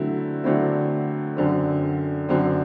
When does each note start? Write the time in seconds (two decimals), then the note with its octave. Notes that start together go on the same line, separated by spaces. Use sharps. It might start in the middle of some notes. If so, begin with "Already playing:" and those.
Already playing: D3 F#3 A3 C4 E4
0.44 D3 F#3 A3 C4 E4
1.37 F#2 D3 F#3 C4
2.29 F#2 D3 F#3 C4